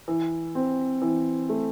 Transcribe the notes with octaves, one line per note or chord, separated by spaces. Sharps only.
E3
C4
E3
A3